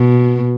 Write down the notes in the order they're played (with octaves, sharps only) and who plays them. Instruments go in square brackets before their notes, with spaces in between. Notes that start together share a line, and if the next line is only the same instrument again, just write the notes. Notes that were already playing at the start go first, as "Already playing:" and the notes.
Already playing: [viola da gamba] B2